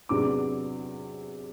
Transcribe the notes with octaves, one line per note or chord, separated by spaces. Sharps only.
E2 C3 F#3 B3 D4 D6